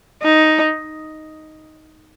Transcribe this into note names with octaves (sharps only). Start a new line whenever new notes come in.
D#4